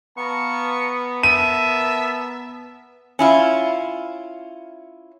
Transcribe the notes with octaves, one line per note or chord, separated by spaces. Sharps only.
B3 F5 A5 A#5 C#6
A#4 E5 A5 D#7
C#4 E4 F4